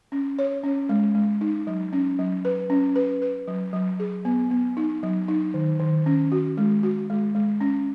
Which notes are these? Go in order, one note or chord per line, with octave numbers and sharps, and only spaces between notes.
C#4
C#5
C#4
G#3
G#3
D#4
F#3
C#4
F#3
B4
C#4
B4
B4
F#3
F#3
G#4
B3
B3
D#4
F#3
D#4
D#3
D#3
C#4
F#4
G#3
F#4
G#3
G#3
C#4